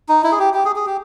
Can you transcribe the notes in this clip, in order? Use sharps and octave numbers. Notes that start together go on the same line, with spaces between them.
D#4
E4
G#4
G4
G4
G#4
G#4
G4